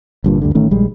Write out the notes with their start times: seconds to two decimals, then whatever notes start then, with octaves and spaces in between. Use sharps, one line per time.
0.24 G1 G2 A#2
0.41 D2 G2 D3
0.55 A1 D#3 A3 C#4
0.71 A#1 G3 G#3